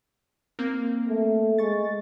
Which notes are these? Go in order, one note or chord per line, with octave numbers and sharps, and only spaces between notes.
A#3 C4
A3
G#3 C#6 A6